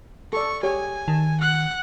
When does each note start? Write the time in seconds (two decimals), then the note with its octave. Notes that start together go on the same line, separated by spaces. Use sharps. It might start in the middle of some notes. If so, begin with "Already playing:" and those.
0.33 A4 D5 C#6
0.63 G4 G#4 C#5 G#5
1.08 D#3 A5
1.41 F#5 F#6